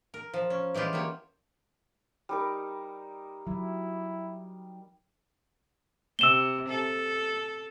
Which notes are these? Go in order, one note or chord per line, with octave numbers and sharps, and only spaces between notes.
A#4
F3
C#4
E3 G3 G#3 F4 G4
F#3 A#3 G4 C#5
G3 D#4 A#4
F#3 E4
C3 E6 E7 G7
A4